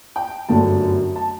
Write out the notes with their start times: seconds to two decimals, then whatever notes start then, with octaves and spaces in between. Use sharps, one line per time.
0.16 G5
0.49 G1 F#2 D3 F#3 A3 A5
1.16 A5